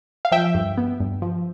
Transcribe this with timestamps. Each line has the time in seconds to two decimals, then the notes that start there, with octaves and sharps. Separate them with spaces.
0.25 F5
0.32 F3 E5 G5
0.55 G2
0.78 B3
1.00 G2
1.22 F3